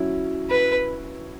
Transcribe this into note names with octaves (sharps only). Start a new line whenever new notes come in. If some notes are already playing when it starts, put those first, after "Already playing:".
Already playing: F#3 C#4 E4
B4